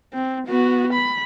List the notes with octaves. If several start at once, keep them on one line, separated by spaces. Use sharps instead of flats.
C4
B3 F#4
B5